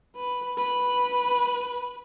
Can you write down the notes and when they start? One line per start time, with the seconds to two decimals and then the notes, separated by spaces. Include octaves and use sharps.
0.16 B4
0.58 B4